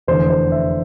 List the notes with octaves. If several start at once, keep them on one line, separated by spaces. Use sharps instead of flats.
F1 E2 D3 C5
C5
E5